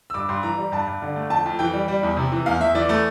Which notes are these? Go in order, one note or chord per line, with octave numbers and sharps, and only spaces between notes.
E6
G2 D6
G2 C6
E3 A#5
G3
G2 A5
G2
D3
A3
F2 A5
F2
E3 G5
G3
G3
E2
C3
E3
E2 F5
E2 E5
E3 D5
A3